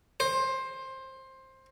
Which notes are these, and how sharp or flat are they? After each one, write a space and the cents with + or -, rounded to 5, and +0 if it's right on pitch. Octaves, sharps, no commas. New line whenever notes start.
C5 +15